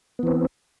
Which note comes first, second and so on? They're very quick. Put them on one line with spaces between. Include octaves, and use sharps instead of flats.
B3 E3 C4